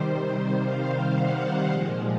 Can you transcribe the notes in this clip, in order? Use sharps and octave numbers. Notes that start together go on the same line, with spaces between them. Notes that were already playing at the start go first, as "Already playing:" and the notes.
Already playing: C3 D#3 G3 C5
F5
F#5
A#2 F3 G#3